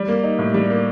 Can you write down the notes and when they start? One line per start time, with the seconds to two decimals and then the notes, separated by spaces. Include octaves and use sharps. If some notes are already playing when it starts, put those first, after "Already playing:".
Already playing: G3
0.08 A#3
0.24 D#4
0.39 A2
0.54 G3
0.70 A#3